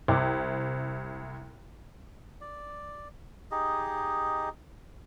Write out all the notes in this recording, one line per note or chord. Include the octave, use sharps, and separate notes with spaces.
C2 C3
D5
D#4 G4 G#4 D#5